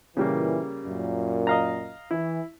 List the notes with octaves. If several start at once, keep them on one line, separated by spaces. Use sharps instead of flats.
A#2 C#3 E3 G3 A#3
F#2 A#2
D#5 F5 A#5
E3 E4